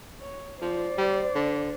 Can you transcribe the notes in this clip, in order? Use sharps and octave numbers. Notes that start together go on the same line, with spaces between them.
C#5
F3 C5 D5
G3
D3